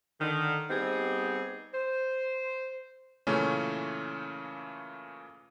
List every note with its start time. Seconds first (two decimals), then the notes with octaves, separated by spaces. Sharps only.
0.20 D3 D#3
0.70 G3 B3 C4 D#4 G4 G#4
1.74 C5
3.27 A#2 C#3 E3 A3 C#4